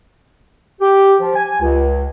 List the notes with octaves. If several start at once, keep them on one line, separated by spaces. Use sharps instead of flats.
G4
F3
G#5
C#2